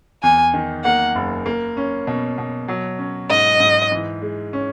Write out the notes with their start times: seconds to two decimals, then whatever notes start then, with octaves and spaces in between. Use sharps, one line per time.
0.23 E2 G#5
0.54 D#3
0.84 A#3 F#5
1.15 F#1
1.46 A#3
1.77 C#4
2.07 B2
2.38 B2
2.68 F#3
2.99 C#4
3.30 G#2 D#5
3.60 G#2
3.92 E3
4.22 G#3
4.53 C#4